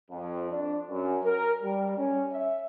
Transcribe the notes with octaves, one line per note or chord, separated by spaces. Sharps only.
F2
D4
F#2
A#4
G3
C#4
E5